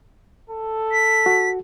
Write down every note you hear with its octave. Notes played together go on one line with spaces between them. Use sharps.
A4
B6
F#4